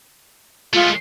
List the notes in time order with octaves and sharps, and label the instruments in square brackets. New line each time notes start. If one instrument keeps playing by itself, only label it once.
[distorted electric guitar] G#3 A3 [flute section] F4